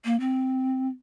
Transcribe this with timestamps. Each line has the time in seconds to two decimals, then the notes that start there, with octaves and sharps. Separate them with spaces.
0.05 A#3
0.20 C4